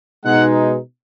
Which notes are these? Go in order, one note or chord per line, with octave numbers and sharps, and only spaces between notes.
B2 G#3 D#4 F#5